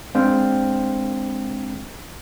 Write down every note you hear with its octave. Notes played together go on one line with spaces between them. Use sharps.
G#3 C4 D4 C5 F5 G5